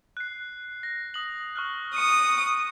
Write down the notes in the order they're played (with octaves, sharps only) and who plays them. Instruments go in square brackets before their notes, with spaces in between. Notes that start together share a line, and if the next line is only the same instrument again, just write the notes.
[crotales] F#6 C7
A#6
D#6 F#7
C#6 F6 F#6
[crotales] C#6 C#7 D#7 [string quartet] D#6